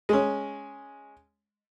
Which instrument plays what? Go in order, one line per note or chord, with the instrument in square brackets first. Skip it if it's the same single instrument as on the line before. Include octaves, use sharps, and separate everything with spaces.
[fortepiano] G#3 C#4